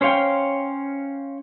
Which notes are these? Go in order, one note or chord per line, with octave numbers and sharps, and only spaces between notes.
C#4 C5 C#5 F5 G5